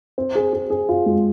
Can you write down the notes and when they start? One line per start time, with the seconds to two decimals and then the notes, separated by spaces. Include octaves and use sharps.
0.18 C4
0.35 G#4
0.53 G#4
0.70 G#4
0.89 F4
1.06 G#3